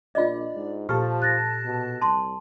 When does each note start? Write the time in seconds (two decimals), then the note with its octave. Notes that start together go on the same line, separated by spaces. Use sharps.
0.15 A#1 D4 F4 D5 D#5
0.55 G#2
0.89 A#2 F3 G4 A4 A5 F6
1.22 F#6 A6 A#6
1.65 B2
2.02 C2 A5 C6